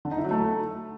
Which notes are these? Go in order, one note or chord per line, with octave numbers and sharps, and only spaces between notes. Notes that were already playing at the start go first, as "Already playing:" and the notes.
D3
D#4
E4
F#3
A3